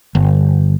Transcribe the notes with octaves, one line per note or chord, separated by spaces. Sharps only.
G1